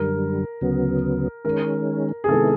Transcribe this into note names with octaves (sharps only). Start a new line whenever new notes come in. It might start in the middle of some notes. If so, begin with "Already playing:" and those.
Already playing: F#2 D3 G3 A#4
D2 C#3 F#3 B3
D#3 G#3 C#4 A#4
G#4
C3 D#3 G#3 B3 E4 A4